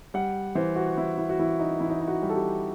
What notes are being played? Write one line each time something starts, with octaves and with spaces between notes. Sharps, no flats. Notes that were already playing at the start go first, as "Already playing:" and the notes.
G3 F#5
E3 C5
F#4
E3 E4
E4
F#4
E3 E4
D#4
E3 E4
D#4
E4
F#4
G3
A4
G4